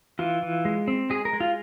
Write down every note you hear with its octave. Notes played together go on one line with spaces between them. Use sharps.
E3 F4
E3
G#3
C4
G#3 G#4
A#4
G#3
F4